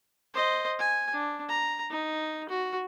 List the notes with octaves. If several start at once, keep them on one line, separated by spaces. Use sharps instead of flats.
C5 D#5
G#5
D4
A#5
D#4
F#4